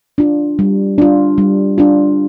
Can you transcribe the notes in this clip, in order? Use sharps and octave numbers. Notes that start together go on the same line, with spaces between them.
D4 F4
G3
D4 F4
G3
D4 F4